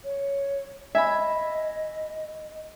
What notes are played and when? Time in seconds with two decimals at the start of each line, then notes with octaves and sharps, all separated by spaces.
0.04 C#5
0.95 D#5 E5 G#5 B5